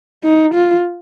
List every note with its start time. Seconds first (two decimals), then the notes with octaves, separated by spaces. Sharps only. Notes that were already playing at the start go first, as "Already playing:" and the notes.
0.24 D#4
0.54 F4